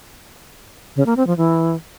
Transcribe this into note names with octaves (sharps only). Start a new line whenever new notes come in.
C#3
A#3
C4
F3
E3